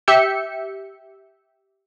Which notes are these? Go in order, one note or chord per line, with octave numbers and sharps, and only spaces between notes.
G4 E5 G6 C#7